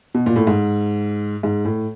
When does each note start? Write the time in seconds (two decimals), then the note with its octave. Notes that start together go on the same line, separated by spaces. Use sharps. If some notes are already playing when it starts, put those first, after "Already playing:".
0.14 B2
0.26 A#2
0.36 A2
0.47 G#2
1.43 G#2
1.65 A2